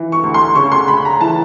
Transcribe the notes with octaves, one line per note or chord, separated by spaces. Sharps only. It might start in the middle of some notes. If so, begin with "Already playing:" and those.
Already playing: E3
C#6
D2
C6
C#3 C#6
C6
D2 B5
A#5
E3 A5